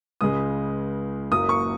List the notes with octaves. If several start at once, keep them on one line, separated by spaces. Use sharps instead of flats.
C#2 C#3 G#3 D#6
F#1 F#2 F#3 A#3 D#6
C#6